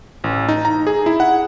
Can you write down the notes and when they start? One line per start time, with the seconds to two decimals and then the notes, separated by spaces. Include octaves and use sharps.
0.24 A1
0.48 D#4
0.65 A#5
0.87 G#4
1.06 E4
1.20 F#5